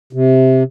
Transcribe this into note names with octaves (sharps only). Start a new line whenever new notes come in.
C3